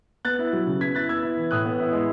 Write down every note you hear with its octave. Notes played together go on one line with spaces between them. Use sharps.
B3 F#6 A6
E4
F#3
C#3
B3 G#6 B6
E4 F#6 A6
B3 E6 G#6
E4
E3
A2 D#6 F#6
B3
E4
G#3